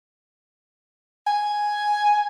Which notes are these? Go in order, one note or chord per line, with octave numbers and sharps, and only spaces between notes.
G#5